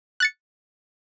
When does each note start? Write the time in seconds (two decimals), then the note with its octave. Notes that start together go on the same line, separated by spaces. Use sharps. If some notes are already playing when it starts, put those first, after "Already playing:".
0.20 F#6 A6 C#7